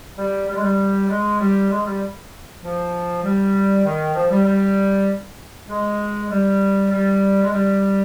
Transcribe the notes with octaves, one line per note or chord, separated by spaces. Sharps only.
G3
G3
G#3
G3
G#3
G3
G#3
G3
F3
G3
D#3
F3
G3
G3
G#3
G3
G3
G#3
G3